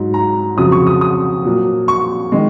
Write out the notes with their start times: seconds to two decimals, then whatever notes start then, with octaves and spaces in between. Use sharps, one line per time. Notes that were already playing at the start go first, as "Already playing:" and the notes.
Already playing: G#2 F#3
0.14 A#5
0.57 F2 C#3 F#3 D#6
0.72 C#6
0.87 D#6
1.01 D#6
1.45 A#2 F#3
1.88 C#6
2.32 D#3 G#3